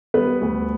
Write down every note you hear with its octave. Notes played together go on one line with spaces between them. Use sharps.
G3 B3 B4
D2